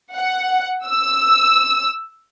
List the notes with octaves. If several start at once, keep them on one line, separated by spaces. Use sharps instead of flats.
F#5
E6